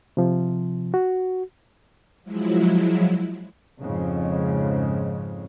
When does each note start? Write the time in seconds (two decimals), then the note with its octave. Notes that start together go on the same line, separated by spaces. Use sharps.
0.17 C3 F3
0.94 F#4
2.23 F3 F#3 G#3 E4
3.80 F2 G#2 C#3